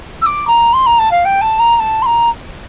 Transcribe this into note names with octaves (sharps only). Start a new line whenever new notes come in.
E6
D6
A#5
C6
A#5
A5
F5
G5
A5
A#5
A#5
A5
C6
A#5